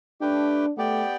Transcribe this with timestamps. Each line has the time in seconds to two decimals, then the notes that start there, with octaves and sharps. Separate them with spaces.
0.21 A3 D4 G4 B4 G5
0.77 A3 B3 G4 D5 G5